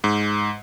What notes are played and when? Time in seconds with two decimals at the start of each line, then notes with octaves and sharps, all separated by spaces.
0.04 G#2